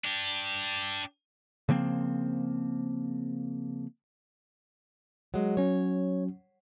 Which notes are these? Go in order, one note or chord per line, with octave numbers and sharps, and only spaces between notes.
D4 G4
C#3 F3 A#3 C4
F#3 G#3
F#3 C#4 C#5